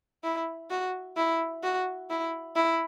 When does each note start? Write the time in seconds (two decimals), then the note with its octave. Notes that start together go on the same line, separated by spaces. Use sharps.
0.24 E4
0.70 F#4
1.17 E4
1.63 F#4
2.10 E4
2.56 E4